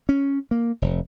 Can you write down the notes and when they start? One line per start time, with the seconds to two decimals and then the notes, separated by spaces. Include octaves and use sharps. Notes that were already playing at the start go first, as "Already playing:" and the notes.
0.09 C#4
0.51 A#3
0.82 F1